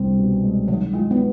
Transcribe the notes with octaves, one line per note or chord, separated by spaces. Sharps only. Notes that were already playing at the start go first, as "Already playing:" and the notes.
Already playing: C2 G3 C4
B2
G#3
D#3 F#3
G#3 F4
B3